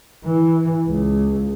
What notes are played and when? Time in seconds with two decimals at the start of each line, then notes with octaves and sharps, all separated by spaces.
0.25 E3
0.88 C#2